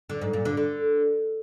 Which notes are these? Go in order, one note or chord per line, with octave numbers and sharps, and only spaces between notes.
D3
G#2
A#2
D3
D3